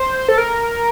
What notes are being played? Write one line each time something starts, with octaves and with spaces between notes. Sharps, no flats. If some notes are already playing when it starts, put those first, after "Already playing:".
Already playing: C5
A4
A#4